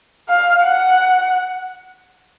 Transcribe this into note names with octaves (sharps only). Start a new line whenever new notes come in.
F5
F#5